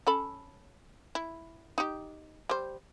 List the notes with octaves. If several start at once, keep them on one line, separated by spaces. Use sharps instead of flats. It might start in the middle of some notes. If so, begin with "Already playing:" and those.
C#4 A4 B5
E4
D#4 G4
G3 C5